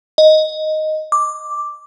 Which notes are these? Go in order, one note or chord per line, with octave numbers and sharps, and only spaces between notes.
D#5
D6